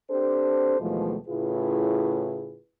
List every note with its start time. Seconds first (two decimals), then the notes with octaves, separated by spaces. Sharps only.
0.10 C4 D4 G4 A4 C5
0.80 D#2 B2 E3 F3 G#3 A3
1.28 A2 C#3 E4 F4 G#4 B4